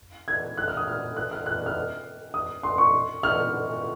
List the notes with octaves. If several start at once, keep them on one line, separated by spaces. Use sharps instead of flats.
G#6
F#6
F6
D#6
F6
F#6
F6
F#6
F6
D#6
C6
C#6
F6